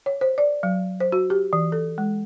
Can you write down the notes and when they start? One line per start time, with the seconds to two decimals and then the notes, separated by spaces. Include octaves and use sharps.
0.06 C#5
0.21 C5
0.38 D5
0.63 F#3
1.00 C5
1.12 F#4
1.30 G4
1.53 E3
1.72 A4
1.98 G#3